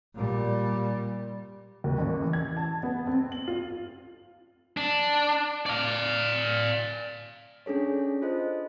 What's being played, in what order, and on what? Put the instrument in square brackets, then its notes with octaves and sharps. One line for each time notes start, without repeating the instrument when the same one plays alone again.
[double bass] A#2 G3
[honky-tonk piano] D#2
A1
E3
G#6
A5
B3
C4
F#7
F4
[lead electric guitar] D4
D5 F5
[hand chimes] C#4 D4 G#4 A4 C#5
F4 A4 C5 D#5